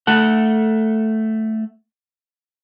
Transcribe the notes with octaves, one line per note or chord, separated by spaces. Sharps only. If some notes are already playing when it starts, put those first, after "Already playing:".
A3 A4 F#5